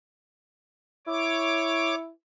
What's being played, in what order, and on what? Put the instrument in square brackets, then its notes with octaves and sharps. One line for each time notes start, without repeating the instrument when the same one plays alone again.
[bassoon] E4 [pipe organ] C#5 D6